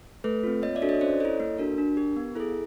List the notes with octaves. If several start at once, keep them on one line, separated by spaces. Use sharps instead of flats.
A3 A4 B4
C4 F4
A#3 C#5 D#5
D5 E5
D4 F#4 A4
C#5 D#5
C#4 C5 D5
E4 A4 C#5 D#5
A#3 A4
D4 F#4 A#4
D4
G4 A#4
B3
E4 G#4 A4